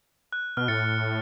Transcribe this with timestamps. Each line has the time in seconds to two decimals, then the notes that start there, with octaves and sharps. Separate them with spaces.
0.33 F#6
0.57 B2 F6
0.68 A2 A6 C#7